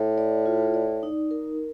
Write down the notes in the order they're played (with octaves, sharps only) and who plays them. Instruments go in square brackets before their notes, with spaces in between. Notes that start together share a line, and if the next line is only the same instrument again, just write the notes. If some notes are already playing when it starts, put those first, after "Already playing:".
Already playing: [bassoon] A2
[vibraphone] D5
F4
D5
D#4
A#4